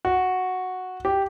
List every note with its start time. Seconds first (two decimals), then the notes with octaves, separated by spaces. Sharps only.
0.05 F#4
1.05 G4